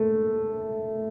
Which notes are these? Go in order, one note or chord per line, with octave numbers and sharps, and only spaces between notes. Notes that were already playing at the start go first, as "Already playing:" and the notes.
Already playing: A3